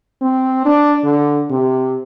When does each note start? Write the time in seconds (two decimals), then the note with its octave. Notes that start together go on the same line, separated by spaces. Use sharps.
0.22 C4
0.66 D4
1.04 D3
1.50 C3